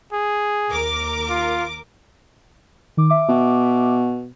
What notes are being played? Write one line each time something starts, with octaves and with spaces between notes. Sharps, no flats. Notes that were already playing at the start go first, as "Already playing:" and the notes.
G#4
D#2 A#4 D6
F4
D#3 D6
E5 D6
B2